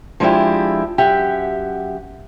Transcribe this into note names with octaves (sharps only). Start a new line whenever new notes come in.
F3 G#3 D4 E4 G4
F#2 G4 E5 F#5